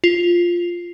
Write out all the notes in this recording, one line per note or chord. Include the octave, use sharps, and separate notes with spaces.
F4